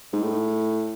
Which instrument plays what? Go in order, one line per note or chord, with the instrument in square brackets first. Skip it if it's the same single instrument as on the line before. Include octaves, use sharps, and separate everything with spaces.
[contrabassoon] G#2
A2